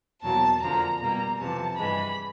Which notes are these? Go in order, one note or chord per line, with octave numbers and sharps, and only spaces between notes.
E2 B2 F#3 A#3 A5
F2 D3 F3 A#3 A#5
B2 G3 A#3 A#5
F2 C3 E3 A5
G2 E3 G#3 B5